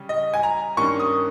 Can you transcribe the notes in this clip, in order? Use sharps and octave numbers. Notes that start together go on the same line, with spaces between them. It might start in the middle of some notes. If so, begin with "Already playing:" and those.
Already playing: C#3 G3 C#4
D#5
G#5
A#5
G2 D#3 A#3 C#4 C#6
D#6